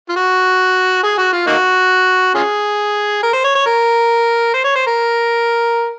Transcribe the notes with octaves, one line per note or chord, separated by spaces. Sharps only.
F4
F#4
G#4
F#4
F4
A#3 D#4 F#4
C#4 F4 G#4
A#4
C5
C#5
C#5
A#4
C5
C#5
C5
A#4